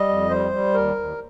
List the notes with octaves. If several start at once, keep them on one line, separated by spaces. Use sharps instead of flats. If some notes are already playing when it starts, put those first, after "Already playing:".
Already playing: G3 D#5
F2
G3 C5
G3
D#2 A#4
D#2